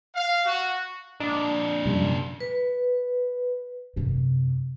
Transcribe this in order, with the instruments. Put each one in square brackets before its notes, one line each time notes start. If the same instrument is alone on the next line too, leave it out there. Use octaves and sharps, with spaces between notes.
[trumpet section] F5
F#4
[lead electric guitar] F2 A#2 [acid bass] D4 [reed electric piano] D#5
[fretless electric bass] F#2 G3 [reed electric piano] C3 F3
[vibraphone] B4
[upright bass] F#2 C3